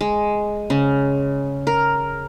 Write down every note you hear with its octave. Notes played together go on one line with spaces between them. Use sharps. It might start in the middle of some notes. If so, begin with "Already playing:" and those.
G#3
C#3
A#4